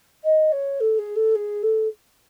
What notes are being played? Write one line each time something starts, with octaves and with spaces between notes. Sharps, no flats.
D#5
C#5
A4
G#4
A4
G#4
A4